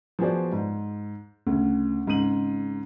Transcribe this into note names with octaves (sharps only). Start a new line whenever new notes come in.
F3 B3 F#4 G#4 C5 D5
G#2
D2 C#3
G#1 G#2 C#3 D#7 F#7